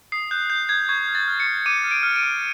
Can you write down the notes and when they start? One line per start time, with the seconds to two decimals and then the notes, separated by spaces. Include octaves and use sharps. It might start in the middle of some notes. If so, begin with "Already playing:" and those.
0.12 D#6 C7
0.31 F#6 G6
0.50 F#6 G6
0.69 D#6 G#6
0.89 C#6 G#6
1.08 F6
1.15 A6
1.28 F6
1.40 C#7
1.47 C#6
1.66 D6 D#7
1.84 F6
1.91 D7
2.03 F6
2.16 D#7
2.23 D6